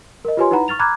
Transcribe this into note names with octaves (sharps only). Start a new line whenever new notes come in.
A#4 D#5
F4 G4 B4 C#5 G#5 C6
D#4 E4 B4 F#5 A#5 B5
C#6 F6 A6 F7
A#5 B5 D6 F6 F#6 G#6